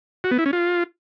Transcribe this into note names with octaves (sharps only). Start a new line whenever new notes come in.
F#4
B3
E4
C#4
F4